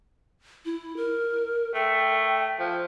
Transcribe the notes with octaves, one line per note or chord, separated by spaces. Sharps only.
E4
A#4
A3 G5
F3